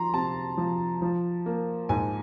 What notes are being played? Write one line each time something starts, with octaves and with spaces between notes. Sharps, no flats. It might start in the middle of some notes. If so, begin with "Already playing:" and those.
Already playing: F3 A#5 C6
C3 A5
F3
F3
A#3
G#2 G#5